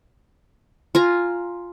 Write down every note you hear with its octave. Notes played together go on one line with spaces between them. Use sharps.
F4 G#5 A#5